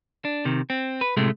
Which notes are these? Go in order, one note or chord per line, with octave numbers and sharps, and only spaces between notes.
D4
C3 D#3
C4
B4
C2 A2 C3 G#3 A3